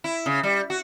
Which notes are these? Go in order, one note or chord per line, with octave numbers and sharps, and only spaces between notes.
E4
C#3
G3
F#4